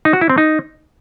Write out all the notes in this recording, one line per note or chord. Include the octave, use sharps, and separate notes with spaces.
D#4
F#4
E4
C4
D#4